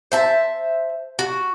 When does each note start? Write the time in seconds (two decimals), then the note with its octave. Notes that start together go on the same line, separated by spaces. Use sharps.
0.12 C5 E5 A5
1.19 F#4